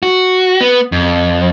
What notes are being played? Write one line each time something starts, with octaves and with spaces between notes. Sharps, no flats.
F#4
B3
F2